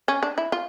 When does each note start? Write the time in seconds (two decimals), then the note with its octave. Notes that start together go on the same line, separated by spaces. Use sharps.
0.08 C#4
0.23 D4
0.38 E4
0.52 F4